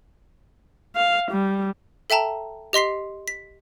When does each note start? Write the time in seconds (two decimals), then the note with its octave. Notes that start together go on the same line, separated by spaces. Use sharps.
0.96 F5
1.32 G3
2.10 A4 E5 G5 A5 A#5
2.73 G4 D#5 C6 B6 C7
3.28 B6